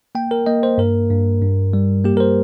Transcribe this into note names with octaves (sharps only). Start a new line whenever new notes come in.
A#3 G5
A#4
A#3 D#5
C5
G2 A#4
G2
G2
G3
A#3 G4
A#4
C5